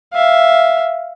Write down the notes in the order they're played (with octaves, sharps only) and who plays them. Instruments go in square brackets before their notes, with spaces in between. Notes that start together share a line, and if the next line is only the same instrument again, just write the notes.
[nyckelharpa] E5 F5